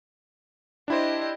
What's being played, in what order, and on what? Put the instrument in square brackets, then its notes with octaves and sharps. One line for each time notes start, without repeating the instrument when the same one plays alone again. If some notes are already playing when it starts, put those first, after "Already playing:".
[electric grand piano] D4 E4 C5 [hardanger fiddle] G4 D#5